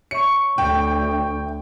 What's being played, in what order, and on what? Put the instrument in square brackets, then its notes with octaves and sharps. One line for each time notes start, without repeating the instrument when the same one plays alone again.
[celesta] C#5 E5 C#6 [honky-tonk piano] C#7
[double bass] D2 [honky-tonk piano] G5